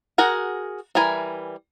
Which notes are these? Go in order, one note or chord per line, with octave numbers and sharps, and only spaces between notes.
F#4 G#4 A#4 F#5
E3 G3 A#4 G#5 B5